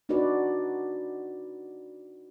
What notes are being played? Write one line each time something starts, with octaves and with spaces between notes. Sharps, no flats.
D4 D#4 F#4 B4 D5